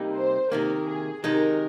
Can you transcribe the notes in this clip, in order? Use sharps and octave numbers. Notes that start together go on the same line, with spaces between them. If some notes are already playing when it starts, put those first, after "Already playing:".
Already playing: C3 G3 A#3 D#4
C5
C3 D#3 A#3 A#4
G#4
C3 D#3 G#3 D#4 A#4